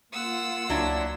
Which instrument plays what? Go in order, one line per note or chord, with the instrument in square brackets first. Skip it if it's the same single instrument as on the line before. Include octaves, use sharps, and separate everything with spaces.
[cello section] A#3 F4 [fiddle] F#5 E6
[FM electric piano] C#2 [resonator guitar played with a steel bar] F#3 D4 E4